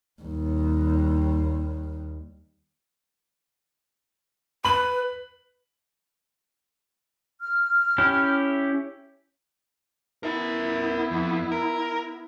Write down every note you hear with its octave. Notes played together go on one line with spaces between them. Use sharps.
D#2 G3
B4 B5 F#7
F6
C#4 E4 G4
B3 E4 A#4 E5
F2
A#4